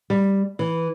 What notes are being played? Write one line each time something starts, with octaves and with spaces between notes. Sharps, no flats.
G3
E3